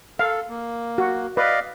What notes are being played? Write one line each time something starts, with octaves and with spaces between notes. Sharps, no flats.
A4 F5
A#3
F#4
B4 D5 D#5 F5